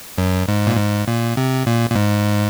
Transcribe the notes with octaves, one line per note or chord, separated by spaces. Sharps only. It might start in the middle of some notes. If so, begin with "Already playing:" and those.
F#2
G#2
A#2
G#2
A#2
C3
A#2
A#2
G#2